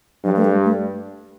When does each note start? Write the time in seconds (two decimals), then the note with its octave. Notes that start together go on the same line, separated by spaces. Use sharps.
0.24 G2 F#3
0.36 A3
0.44 G3
0.65 A3